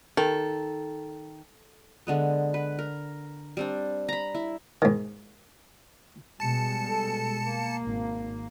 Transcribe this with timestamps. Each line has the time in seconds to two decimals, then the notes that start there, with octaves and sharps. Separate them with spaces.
0.17 D#3 A4
2.07 D3 G#3 B3
2.54 B4
2.79 A#4
3.57 G3 C4 D4
4.09 A#5 B5
4.34 E4
4.82 G#2 D#3
6.40 B2 G3 G#3 A5 C#7
6.89 A4
7.42 A#3
7.84 G#1